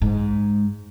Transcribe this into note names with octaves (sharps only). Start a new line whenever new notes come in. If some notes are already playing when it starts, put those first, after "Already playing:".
G#2